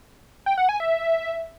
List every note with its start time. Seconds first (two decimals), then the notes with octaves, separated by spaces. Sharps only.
0.46 G5
0.58 F#5
0.69 G#5
0.80 E5